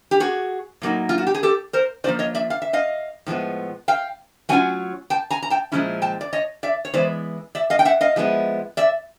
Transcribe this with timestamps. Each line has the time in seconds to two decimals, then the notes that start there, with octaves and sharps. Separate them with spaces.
0.11 G4
0.20 F#4 G#4
0.82 A2 F#3 A#3 D#4
1.09 F4
1.18 F#4
1.27 G4
1.34 G#4
1.43 G4 A4
1.73 A#4 C5
2.04 F3 A#3 D4 F4 C5 D5
2.19 C#5 D#5
2.35 D5 E5
2.50 F5
2.62 E5
2.73 D#5 F5
3.26 A2 F3 G#3 B3
3.88 F5 G5
4.49 F#3 A3 C#4 F4 F#5 G#5
5.10 G5 A5
5.30 G#5 A#5
5.42 A#5
5.50 G5 A5
5.72 A#2 F3 G#3 C#4 E4
6.02 G5 A5
6.21 D5
6.33 C#5 D#5
6.63 D5 E5
6.85 C#5
6.94 E3 G#3 B3 E4 C5 D5
7.55 D5 E5
7.70 D#5 F5
7.79 G5
7.85 E5 F#5
8.01 D#5 F5
8.16 F3 G#3 B3 E4
8.77 D5 E5